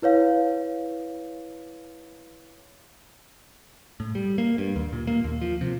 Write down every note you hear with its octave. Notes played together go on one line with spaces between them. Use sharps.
E4 B4 C#5 F5
A2
G3
A#3
G2
D#2
A#2
A#3
D#2
F3
C3